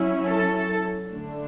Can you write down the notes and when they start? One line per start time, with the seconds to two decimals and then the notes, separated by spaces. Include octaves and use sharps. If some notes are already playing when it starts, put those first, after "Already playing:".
Already playing: F#3 C#4 E4
0.27 A4
1.09 D3 A3 D4